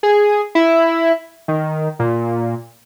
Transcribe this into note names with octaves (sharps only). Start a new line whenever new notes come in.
G#4
E4
D#3
A#2